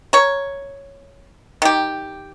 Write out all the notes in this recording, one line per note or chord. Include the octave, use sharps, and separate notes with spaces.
A#4 C#5
D#3 G4